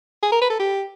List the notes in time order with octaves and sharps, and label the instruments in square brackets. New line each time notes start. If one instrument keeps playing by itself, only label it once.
[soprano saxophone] G#4
A#4
B4
A4
G4